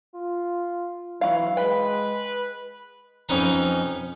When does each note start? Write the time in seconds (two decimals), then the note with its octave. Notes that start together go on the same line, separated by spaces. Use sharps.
0.15 F4
1.21 E3 F#3 C4 F5
1.57 G#3 B4 G5
3.29 F2 C#4 D#4 B4 A#5